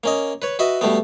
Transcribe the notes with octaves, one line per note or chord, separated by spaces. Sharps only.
A#3 C#4 D#5
B4 C#5
F#4 B4 D#5 E5
B2 G3 A3 B3